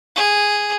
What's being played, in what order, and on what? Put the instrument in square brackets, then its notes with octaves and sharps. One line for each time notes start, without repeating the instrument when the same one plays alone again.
[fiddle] G#4